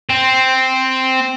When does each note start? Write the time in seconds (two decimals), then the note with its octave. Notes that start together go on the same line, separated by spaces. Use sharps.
0.10 C4